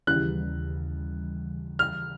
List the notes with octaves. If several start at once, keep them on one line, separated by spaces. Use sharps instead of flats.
D#2 C#3 E3 G3 F#6
F6